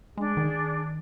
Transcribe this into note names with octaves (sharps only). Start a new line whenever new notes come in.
G#3 D4 G#4
D#3